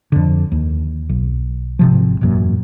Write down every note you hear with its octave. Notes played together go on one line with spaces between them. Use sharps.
F2 D3
D#2
B1
G#1 C3 F3
E1 A1 F#2 A#2